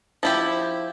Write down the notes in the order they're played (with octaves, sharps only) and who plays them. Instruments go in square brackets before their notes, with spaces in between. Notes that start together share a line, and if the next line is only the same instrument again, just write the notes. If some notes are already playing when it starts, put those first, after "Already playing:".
[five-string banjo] F3 E4 G4